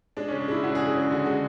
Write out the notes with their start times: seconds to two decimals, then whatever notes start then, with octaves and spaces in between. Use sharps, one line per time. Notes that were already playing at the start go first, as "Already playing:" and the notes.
0.17 G#3 D4
0.28 C#3 C#4
0.40 D4
0.48 G#3 E4
0.63 C#3 F#4
0.75 G#4
0.79 G#3
0.87 G#4
0.95 C#3
1.11 D3 F#4
1.26 G#3